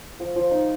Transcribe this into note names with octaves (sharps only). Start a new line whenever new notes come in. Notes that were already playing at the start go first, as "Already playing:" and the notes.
F3 D6
F3
D#4